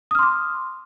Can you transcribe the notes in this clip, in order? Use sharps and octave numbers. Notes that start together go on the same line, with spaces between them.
C6 D6 D#6 F6